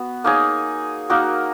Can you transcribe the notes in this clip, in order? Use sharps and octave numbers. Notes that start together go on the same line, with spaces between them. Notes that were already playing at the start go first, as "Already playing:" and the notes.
Already playing: B3 F#4
A#3 D#4 G#4 C#5
A#3 D#4 F#4 A#4